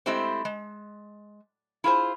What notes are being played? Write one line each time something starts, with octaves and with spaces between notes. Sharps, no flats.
G#3 A3 C4 E4 G4 C5
G#3
E4 F4 G#4 C5